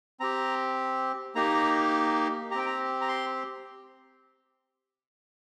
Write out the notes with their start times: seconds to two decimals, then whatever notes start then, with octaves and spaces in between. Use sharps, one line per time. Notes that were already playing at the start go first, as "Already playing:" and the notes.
0.20 C4 G4 A#5
1.35 A#3 D#4 G4 A#5
2.51 G4 A#5
2.55 C4 G5
2.66 A#5
3.01 A#5
3.08 C6